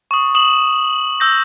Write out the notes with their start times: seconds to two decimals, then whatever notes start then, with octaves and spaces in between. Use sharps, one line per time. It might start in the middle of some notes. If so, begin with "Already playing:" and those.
0.11 C#6 D#6
0.35 D#6 E7 F#7
1.20 E6 G6 A#6